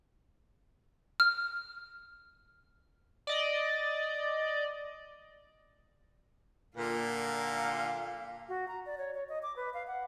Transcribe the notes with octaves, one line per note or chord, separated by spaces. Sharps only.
F6
D5 D#5
A#2 D3 A#4 F5
F#4
A#5
D5
C#5
C#5
D#5
D6
B4
F5
F#5